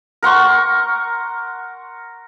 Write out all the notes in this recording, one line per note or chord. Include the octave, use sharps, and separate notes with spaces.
A#4 F#5 C6 C#6